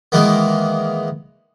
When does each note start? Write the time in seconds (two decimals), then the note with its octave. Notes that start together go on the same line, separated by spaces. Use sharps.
0.12 D#3 E3 G#3 A#3 B3